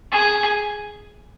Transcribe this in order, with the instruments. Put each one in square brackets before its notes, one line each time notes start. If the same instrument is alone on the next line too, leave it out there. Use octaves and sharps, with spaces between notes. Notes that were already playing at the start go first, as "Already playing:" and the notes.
[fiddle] G#4